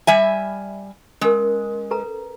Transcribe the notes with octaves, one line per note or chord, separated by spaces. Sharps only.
G3 E5 G#5
G#3 C#4 A#4
A4 B4 A#5